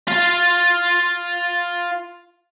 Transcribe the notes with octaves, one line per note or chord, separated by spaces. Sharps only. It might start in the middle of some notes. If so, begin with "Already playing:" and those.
F4 F5